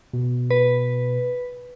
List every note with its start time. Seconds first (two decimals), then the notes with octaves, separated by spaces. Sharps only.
0.14 B2
0.51 B4